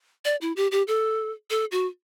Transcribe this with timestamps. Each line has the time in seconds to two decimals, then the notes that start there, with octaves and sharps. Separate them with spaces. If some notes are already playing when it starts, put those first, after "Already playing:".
0.25 D5
0.41 E4
0.56 G4
0.71 G4
0.88 A4
1.50 A4
1.72 F#4